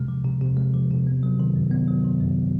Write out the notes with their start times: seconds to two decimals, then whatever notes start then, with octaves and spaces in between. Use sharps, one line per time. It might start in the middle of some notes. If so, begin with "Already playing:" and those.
Already playing: C3 G#3
0.08 F3
0.25 C3
0.41 C3
0.57 G#3
0.74 F3
0.91 C3
1.07 B3
1.23 F#3
1.40 D#3
1.56 F#2
1.71 B3
1.88 F#3
2.05 D#3
2.21 F#2